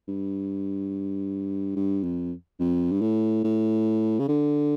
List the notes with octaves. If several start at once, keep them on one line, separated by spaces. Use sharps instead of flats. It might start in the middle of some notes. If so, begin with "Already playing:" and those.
G2
G2
F2
F2
G2
A2
A2
C#3
D3